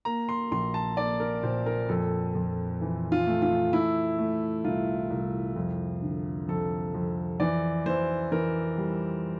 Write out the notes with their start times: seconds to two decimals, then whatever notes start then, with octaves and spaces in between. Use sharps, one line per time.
0.05 A#3 A#5
0.29 C6
0.52 A#1 C6
0.74 A5
0.97 A#3 D5
1.20 A#4
1.43 A#2 C5
1.66 A#4
1.89 F2 A4
2.35 F2
2.81 E3
3.12 F4
3.27 A3
3.42 F4
3.73 A3 E4
4.19 A3
4.64 C2 F4
5.10 C2
5.56 F2
6.02 D3
6.48 F2 A4
6.94 F2
7.40 E3 D5
7.86 E3 C5
8.32 E3 A#4
8.78 G3